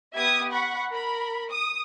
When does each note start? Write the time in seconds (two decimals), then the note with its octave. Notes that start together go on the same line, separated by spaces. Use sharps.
0.14 B3 G4 E5 D#6 G#6
0.50 F#5 B5 C#6
0.92 A#4 B5
1.50 D#6